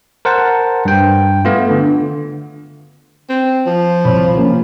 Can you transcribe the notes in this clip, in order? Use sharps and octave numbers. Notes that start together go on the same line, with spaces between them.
A#4 C5 F#5 A5
G2 G5
A3 B3 F4
D3
C4
F3
C2 C#5 B5
F3 A#3 C#4